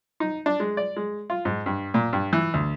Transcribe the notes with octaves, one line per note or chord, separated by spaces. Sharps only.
D#4
D4
G#3
D5
G#3
F4
G#2
G2
A#2
G2
E3
D2